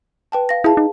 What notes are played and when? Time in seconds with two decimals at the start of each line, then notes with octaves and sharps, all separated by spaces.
0.32 B4 G5 A5
0.49 F5 A#6
0.64 E4 G#4 F5 A5
0.77 D#4